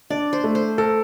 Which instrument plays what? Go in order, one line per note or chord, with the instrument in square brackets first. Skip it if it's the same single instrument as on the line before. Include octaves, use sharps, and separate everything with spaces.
[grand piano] D4 [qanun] D5
[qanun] C5
[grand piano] A3
[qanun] C5
[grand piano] A4 [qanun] A#4